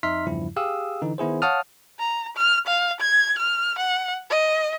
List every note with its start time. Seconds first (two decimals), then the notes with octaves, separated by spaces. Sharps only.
0.03 F2 D#4 E5 C6 F6 B6
0.27 E2 G2 C#3 F3 E4
0.56 G4 G#4 F5 D#6 E6
1.02 D3 E3 D#4
1.18 D#3 B3 E4 G#4 C5
1.42 C#5 F5 F#5 A5 D#6 F6
1.99 A#5
2.37 F6
2.67 F5
3.00 G#6
3.38 F6
3.78 F#5
4.30 D#5